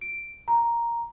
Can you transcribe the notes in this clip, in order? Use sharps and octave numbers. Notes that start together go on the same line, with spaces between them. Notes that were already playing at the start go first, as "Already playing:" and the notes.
D7
A#5